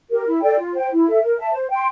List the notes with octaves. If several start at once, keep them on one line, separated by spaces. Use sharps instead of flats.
G4 A#4
E4
A4 D5 G5
F4
C5 G5
E4
A4 E5
A#4
E5 A5
C5
G5 C6